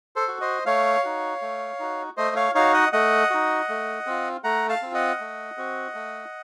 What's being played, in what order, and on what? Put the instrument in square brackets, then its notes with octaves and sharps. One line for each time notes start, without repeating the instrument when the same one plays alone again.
[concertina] A4 C5
F#4
C5 D#5
A3 C#5 F5
D#4 F#4
A3
D#4 F#4
A3 C5 D#5
C#5 F5
D#4 F#4 C#5 F5
D#5 F#5
A3 D#5 F#5
D#4 F#4
A3
C4 F4
A3 F#5 A#5
F5 A5
C4 F4
D#5 F#5
A3
C4 F#4
A3